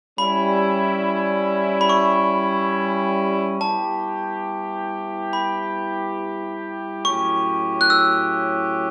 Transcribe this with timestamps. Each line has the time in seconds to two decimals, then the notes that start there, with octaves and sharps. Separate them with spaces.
0.18 G3 C#4 E4 B5
1.81 B5
1.89 C#6
3.61 G3 B3 E4 G4 A5
5.33 B5
7.05 A2 F#3 C#4 G4 C#6
7.81 F#6
7.90 E6